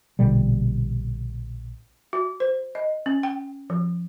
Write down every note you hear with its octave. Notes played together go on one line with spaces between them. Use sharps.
A#1 B2 D3 G3
F#4
C5
D#5
C#4
G5
F3